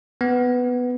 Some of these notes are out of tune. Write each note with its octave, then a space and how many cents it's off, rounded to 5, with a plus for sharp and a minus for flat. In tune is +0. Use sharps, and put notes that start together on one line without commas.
B3 +5